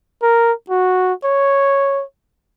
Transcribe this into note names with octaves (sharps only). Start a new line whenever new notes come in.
A#4
F#4
C#5